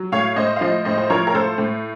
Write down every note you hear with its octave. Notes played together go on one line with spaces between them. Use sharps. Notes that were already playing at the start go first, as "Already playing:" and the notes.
Already playing: F#3
A2 C#5 F5
A2 C5 D#5
F5
F3 C5 D#5
A2 C5 D#5
C5
F3 A#4 C#5
A#4
A2 A4 C5
A2